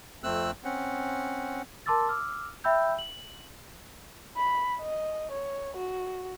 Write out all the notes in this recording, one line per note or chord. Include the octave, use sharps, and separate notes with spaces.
F2 A3 C4 E6 F#6
C4 C#4 F#5
A#4 A5 C6 D6 E6 A6
D6 E6 F6
E5 G5 B5 E6 G6
F#7
B5
D#5
C#5
F#4